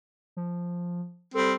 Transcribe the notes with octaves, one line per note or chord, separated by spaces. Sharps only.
F3
G3 C4 A4